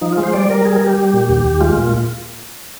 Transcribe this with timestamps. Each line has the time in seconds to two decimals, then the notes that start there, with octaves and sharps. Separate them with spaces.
0.01 F3 D#4
0.12 F4
0.17 G#3
0.23 C5
0.33 G3 D5
0.50 G3 A#4
0.65 G3 G#4
0.76 A#4
0.81 G3 G4
0.98 G3
1.14 A#2
1.29 D#2 G4
1.44 D#2
1.60 G#3 F4
1.77 A#2